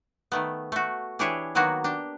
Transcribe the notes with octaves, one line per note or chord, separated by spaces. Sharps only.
D#3 A3 B3
A3 F#4
E3 D4 E4 G4 G#4 C#5
D#3 F#3 A#3 B3 F#4
D4 G4